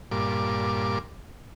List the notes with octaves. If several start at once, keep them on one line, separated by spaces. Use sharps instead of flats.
G2 A#2 D6